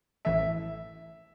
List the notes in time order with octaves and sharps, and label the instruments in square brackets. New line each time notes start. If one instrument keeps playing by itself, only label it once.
[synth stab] A1 A2 E3 A3 [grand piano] E5